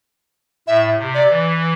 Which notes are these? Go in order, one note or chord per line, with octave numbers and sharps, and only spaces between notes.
A2 E5
C3
D5
E3